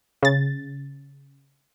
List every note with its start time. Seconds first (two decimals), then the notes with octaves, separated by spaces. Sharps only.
0.23 C#3 A6